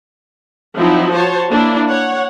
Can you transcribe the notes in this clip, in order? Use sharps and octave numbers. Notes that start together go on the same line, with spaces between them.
F3 F#3 C4 D#4 E4
F#4 C5 C#5 A5
A#3 D4 E4
C#5 F#5